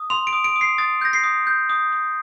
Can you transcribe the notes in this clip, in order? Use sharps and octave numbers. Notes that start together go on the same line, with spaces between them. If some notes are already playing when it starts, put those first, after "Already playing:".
Already playing: D#6
C6 F7
D7
D#6
D7
D#6
C7
D#6 A6
G6 A#6
C7
D#6
G6
D#6
D#6